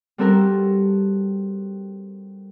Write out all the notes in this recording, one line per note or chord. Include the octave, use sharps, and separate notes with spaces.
G3 C4 F#4 A4 A#4